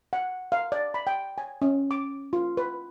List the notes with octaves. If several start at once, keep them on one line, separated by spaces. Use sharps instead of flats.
F#5
F5
D5
B5
G5
G#5
C#4
D6
F4
B4